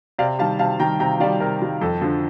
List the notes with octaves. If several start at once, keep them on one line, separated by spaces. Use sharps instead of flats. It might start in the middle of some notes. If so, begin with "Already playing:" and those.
C3 D5 F5
D#3 G3 F5 A5
C3 F5 A5
D#3 G3 G5 A#5
C3 G5 A#5
D#3 G3 D5 F5
C3 A#4
D#3 G3
F2 A4
D3 F3